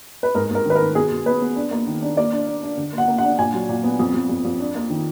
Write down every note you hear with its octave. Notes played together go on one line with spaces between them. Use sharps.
B4
G#2 A#4
G#2 A#4
D#3 B4
A#4
D#3
B2 G#4
B2
B3 B4
B3
D4
A#3
D#3
D4
A#3 D5
D4
D4
D4
D3
A#3
F#5
A#3
F#5
D4
A#2 G#5
F#3
A#2
B3
F2
F2
F2
F2
D4
A#3
D#3